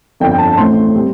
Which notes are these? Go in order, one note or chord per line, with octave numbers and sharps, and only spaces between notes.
G1 F2 D3 G5
G5
A5
A5
A1 A2 A3 C4 C6
G3 C4